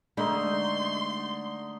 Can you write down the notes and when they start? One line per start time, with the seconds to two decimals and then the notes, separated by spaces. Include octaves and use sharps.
0.17 D3 G#3 A3 D#4 C6